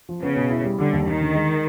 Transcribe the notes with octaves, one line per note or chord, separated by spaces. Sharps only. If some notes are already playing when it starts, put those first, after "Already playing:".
F3
C#3 B3
B2
E4
G3
D3 G3
D#2
D#2 D#3
D3
G#3